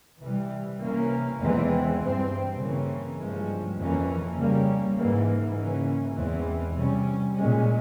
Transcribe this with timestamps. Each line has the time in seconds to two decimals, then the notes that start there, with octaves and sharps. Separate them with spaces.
0.22 C3 E3 G3
0.81 C3 E3 A#3 C#4
1.41 E2 E3 G#3 C4
2.00 G2 G3 C4
2.60 C#3 E3 A#3 C#4
3.19 G2 F3 G#3 C#4
3.79 F2 E3 A#3 C#4
4.38 C#3 G3 A#3 C#4
4.98 G#2 E3 A#3
5.56 C#3 E3 A#3 C#4
6.16 E2 E3 G#3 C4
6.75 C3 G3 C#4
7.35 A#2 G#3 C#4